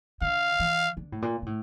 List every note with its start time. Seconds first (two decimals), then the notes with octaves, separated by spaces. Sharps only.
0.21 D3 F5
0.59 E3
0.97 D3
1.12 A2
1.22 A#2
1.42 A#2
1.46 A2